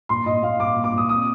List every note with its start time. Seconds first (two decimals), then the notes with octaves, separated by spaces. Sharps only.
0.09 A#2 C6
0.26 A#2 D#5
0.42 A#2 F5
0.59 A#2 D6
0.76 A#2
0.84 D6
0.93 A#2 D#6
1.09 C4 D#6